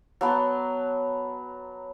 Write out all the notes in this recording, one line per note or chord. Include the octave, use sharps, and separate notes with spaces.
F#3 B3 A5